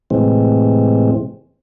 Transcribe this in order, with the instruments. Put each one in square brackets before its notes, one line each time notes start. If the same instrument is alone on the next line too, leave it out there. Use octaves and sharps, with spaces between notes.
[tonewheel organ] A2 C3 E3 G#3 C4